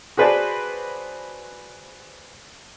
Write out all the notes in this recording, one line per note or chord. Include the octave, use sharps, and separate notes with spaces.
F#4 G#4 B4 C5 D5 A5